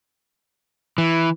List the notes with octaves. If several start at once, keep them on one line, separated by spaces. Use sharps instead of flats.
E3